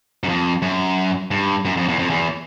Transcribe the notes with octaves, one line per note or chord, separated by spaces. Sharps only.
F#2
F2
F#2
G2
F#2
F2
E2
F2
E2